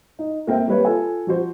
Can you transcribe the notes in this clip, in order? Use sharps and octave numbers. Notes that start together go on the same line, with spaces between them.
D#4
A#3 C4 A#4 E5 G5
G3 A#3 B4 C#5
F4 A4 G#5
F3 F#4 C5